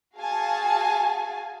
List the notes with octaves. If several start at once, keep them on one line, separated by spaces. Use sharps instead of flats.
F#4 G#4 F5 G#5 A5